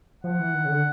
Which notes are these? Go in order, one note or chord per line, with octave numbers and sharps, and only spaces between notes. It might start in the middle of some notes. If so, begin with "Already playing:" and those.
F3 F#5
E3
D#3
C#3
D3